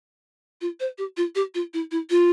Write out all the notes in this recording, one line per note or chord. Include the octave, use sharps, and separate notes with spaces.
F4
C5
G4
F4
G4
F4
E4
E4
F4